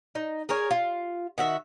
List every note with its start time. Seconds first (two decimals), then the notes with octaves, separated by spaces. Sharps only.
0.15 D#4
0.49 G#4 A#4 C#5 G#5
0.71 F4
1.38 D#3 F#4 E5